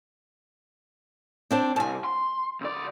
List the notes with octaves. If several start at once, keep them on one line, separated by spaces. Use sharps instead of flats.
C4 D4 C5
C2 G#5 A5
C6
C#2 D5